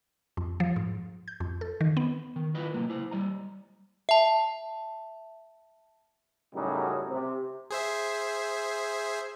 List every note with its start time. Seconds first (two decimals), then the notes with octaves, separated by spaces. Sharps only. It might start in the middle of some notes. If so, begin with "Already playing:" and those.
0.37 F2
0.60 F3
0.76 G#2
1.28 G6
1.40 F2
1.61 A4
1.81 D#3
1.97 B3
2.36 D#3
2.54 E4 F4 B4 D#5
2.74 C3 F#3 G#3 A#3
2.90 E4 C5
3.11 G3 D#5 A#5
4.09 E5 A5
6.54 F#2 A2 C#3 F#3 G3 D#4
7.09 C3
7.70 G#4 C5 E5